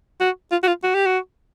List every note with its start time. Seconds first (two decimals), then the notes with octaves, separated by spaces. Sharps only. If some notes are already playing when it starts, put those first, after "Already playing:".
0.20 F#4
0.52 F4
0.63 F#4
0.68 F4
0.84 F#4
0.95 G4
1.06 F#4